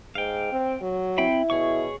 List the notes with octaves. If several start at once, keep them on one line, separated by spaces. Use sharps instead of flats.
G#2 F5 G5
C4
F#3
C4 E4 G5 B5
B2 G#4 C#5 C#6